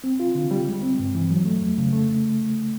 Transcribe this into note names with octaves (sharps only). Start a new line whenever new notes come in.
C4
F4
D3
G3
G#3
C4
G2
E3
F#3
A3
F2
C#3
A3